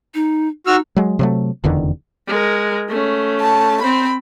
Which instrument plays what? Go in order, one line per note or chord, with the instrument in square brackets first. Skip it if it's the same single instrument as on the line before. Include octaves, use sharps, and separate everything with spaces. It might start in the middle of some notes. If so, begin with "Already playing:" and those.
[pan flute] D#4
[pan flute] D#4 [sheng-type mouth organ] F#4 E6 F6
[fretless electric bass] F#3 G#3
C3 F#3 A3
F1 E2 D3 D#3
[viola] G#3 A#4
A3 C#4
[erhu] A5
[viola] C4 C5 [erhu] B5